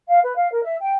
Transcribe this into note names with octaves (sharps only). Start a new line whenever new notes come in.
F5
B4
F5
A#4
E5
G5